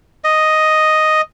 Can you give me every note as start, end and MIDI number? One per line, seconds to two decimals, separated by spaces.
0.24 1.21 75